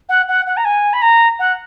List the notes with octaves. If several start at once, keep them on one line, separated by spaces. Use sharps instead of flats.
F#5
F#5
F#5
A#5
G#5
B5
A#5
F#5